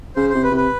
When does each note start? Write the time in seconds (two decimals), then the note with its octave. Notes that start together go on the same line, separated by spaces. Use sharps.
0.16 C#3 C5
0.30 C3 C5
0.43 B4
0.51 C3
0.57 B4